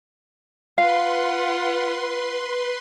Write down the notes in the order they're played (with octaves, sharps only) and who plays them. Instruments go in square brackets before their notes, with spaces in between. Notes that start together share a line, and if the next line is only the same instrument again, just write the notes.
[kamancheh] F4 F#5 [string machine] B4 C6 [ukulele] F5